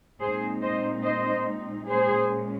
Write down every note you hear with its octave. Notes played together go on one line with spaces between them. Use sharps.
A#2 G#3 C4 D#4 G#4 C5
C5 D#5
C5 D#5
A#2 G#3 C#4 G#4 C5